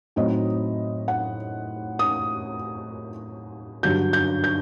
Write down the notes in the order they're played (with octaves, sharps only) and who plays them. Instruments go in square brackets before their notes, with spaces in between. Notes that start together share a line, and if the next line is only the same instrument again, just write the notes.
[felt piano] A2 F#3 C4 D#4 D#5
F#5
D#6
G2 D3 F#3 G6
G6
G6